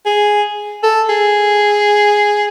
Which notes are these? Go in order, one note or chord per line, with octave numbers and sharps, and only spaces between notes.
G#4
A4
G#4